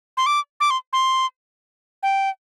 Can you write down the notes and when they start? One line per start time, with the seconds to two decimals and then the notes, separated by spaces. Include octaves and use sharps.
0.17 C6
0.26 D6
0.60 D6
0.70 C6
0.93 C6
2.03 G5